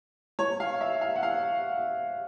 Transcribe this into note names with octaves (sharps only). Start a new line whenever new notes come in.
C#5
F5
E5
F5
F#5
F5